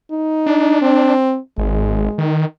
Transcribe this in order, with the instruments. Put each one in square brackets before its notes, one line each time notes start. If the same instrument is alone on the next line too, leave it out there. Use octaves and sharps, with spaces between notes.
[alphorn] D#4
[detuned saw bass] D4
[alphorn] C4
[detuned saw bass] G#1 [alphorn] G#3
[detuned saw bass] D#3